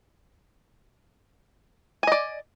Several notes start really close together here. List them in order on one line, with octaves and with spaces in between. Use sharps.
G#5 D#5 D5